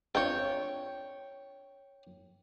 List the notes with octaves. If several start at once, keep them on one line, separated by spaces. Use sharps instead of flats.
C4 D4 F4 C#5 G5